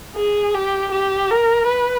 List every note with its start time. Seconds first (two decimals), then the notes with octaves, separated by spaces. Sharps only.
0.15 G#4
0.54 G4
0.91 G4
1.30 A#4
1.67 B4